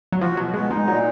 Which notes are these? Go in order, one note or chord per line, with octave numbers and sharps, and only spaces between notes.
F#3
F3 F#4
B2 F#3
G#3 B3
G#3 D#4
A#2 F#3